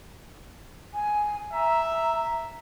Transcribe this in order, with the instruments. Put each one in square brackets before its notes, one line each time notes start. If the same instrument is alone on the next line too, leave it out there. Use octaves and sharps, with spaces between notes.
[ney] G#5
[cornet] E5 [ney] A#5